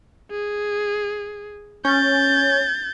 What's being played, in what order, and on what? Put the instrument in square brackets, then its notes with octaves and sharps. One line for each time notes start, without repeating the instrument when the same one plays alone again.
[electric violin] G#4
[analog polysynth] C#4 [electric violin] G6 A6